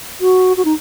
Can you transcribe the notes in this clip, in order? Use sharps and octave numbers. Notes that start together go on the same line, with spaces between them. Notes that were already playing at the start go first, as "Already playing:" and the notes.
F#4
F#4
D#4